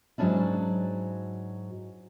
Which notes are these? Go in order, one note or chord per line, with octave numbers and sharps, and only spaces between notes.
G#2 F#3 G#3 C#4 D4 E4